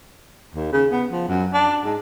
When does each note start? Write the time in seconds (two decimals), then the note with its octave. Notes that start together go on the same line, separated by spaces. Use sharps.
0.55 D#2
0.73 C#3
0.91 B3
1.12 F3
1.28 F#2
1.54 D4
1.85 G#2